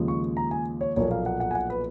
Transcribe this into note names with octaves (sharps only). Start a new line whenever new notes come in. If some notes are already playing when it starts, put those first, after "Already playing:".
Already playing: D#2 C#3 F3 G#3
C#6
A#5
G#5
C#5
B1 A#2 F3 A#3 C#5
F5
F#5
F#5
G#5
F#5
B4